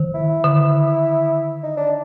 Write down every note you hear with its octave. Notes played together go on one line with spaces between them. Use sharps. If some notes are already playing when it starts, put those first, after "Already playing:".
Already playing: D#3
E4
D3
D#4
D4